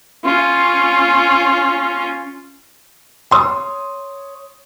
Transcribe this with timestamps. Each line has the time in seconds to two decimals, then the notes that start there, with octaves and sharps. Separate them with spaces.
0.24 C#4 F4
3.32 C#5 C6 D#6